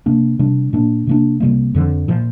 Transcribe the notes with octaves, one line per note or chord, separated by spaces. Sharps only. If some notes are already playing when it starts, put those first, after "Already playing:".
C3 A#3 D4
C3 G3 D4
A#2 A#3 D4
C3 A#3 D4
C2 C3 G3 A#3
F2 D3 F3
A#2 F3